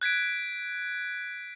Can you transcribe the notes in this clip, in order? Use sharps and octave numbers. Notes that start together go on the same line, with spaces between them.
F#6 G#6 B6 D7